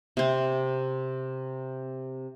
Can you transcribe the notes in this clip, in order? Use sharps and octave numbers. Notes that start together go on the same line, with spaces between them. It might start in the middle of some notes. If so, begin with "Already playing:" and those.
C3 C4